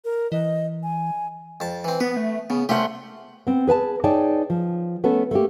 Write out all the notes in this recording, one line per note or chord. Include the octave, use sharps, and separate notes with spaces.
A#4
E3 D#5
G#5
F2 A5
E3 C4
B3 B4
A3
C#3 B3
C2 A3 C#4 G4 F#5 C6
B3 C4
G#4 B4 G#5 A5
D#4 G#4 C#5 D5 G5 A5
F3
A3 B3 C#4 A4
A3 A#3 G4